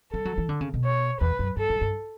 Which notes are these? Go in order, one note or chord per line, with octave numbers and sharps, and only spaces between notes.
G3 A4
F#3
E3
D3
C#3
B2
C#5
E2 B4
F#2
G2 A4
G2
G2